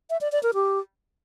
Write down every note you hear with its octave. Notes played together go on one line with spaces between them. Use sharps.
E5
D5
D5
A#4
G4